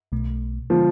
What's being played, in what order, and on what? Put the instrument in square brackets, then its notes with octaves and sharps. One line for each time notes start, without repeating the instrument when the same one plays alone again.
[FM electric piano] B1 B2 A3
[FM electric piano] D3 G#3 B3 [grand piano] F3